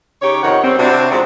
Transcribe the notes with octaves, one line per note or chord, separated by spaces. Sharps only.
C#3 D#4 G4 C#5
F2 C3 D#3 D#4 C#5 F#5
G3 C4
C3 C4 D4 E4 F#4
F2 C3 G#3 C4